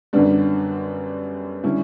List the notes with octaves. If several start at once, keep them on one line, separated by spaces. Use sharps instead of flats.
F#2 D3 G3 B3 D4
D3 G3 C#4 E4